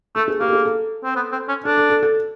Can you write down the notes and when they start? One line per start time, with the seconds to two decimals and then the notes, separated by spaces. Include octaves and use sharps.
0.15 A3 A4
0.28 G#4
0.40 A#3 G4
0.49 A4
0.53 G#4
0.65 A4
1.04 C4
1.16 B3
1.32 C4
1.49 C#4
1.65 D4 A4
1.77 A4
1.90 A4
2.03 A4